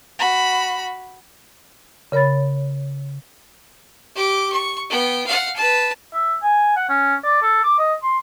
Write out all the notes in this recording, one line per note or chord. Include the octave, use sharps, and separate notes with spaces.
F#4 B5
C#3 A#4 C#5 B5 A6
G4 D6
C#6
B3 G5
F5 F#5
B4 A5
E5
G#5
F#5
C#4
D5
A4
D6
D#5
C6